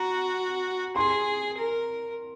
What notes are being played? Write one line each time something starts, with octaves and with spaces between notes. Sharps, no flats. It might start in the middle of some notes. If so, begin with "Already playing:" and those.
Already playing: F#4 A#5
G#4 C6
A#4